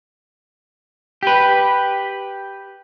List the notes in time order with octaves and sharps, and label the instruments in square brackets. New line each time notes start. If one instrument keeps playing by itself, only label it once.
[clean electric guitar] G4 B4